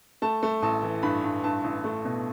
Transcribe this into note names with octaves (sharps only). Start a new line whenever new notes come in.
A3 A5
A3
A1 A5
E3
G2 B5
G2
G2 A5
A1
A3
B2